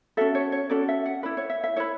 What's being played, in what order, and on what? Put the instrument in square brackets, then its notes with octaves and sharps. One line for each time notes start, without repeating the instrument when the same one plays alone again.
[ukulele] C#4 F#4 A4 E5
C#5
C#5
C#4 F#4 A4 D5
E5
F#5
E4 B4 D5
C#5
E5
E5
E4 B4 C#5